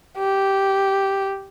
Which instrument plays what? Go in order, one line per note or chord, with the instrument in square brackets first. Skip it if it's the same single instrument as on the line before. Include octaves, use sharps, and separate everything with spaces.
[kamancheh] G4